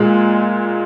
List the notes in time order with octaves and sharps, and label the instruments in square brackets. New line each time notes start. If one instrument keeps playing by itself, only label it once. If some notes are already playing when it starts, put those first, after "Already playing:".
Already playing: [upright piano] A#2 G#3